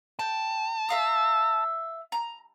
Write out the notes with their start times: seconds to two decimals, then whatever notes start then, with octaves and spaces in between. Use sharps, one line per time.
0.19 G5 A5
0.89 E5 F5 D#6
2.12 A#5